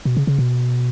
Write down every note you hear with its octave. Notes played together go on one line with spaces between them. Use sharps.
B2
C#3
C#3
B2